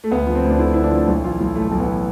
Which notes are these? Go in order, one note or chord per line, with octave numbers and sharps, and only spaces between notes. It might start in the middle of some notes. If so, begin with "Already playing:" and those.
A3
D2 B3
F3
C4
D2
D4
D3 E4
D2 E4
D4
F3
B1 E4
E3 F4
B1 E4
A2 A3
B1 A3
B3
E3